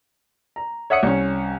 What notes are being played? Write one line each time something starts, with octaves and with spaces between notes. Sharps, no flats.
A#5
C#5 E5 F#5 D#6 C#7
C2 C#4